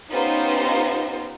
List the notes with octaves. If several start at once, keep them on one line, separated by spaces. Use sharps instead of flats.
B3 C#4 D#4 F4 G4 C5